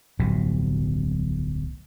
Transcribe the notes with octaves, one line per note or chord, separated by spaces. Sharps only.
D1 B1 B2 F3